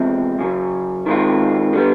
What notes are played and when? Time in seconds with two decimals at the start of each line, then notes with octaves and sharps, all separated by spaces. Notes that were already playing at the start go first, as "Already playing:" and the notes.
Already playing: E2 C3 F3 G#3 C4
0.39 F#2 C#3 F#3
1.06 D#3 G#3 C4 F4
1.73 D3 G3 B3